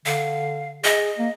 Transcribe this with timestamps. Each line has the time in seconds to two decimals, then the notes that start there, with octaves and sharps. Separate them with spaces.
0.06 D3 F5
0.84 G#4 D#5
1.18 A#3